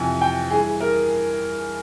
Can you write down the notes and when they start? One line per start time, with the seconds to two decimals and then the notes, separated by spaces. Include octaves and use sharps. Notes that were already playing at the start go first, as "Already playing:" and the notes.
Already playing: F2 C3 E3 G#5
0.21 G5
0.50 G2 E3 G#4
0.81 A#4